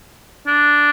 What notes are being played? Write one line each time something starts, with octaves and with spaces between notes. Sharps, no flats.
D4